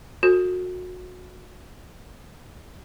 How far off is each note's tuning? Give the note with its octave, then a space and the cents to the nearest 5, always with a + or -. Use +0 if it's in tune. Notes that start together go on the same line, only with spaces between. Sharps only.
F#4 -30 A4 +40